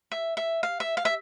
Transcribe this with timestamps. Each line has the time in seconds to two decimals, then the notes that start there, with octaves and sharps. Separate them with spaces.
0.12 E5
0.37 E5
0.63 F5
0.80 E5
0.97 F5
1.05 E5